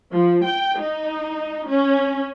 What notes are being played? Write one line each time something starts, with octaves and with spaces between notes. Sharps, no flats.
F3
G5
D#4
C#4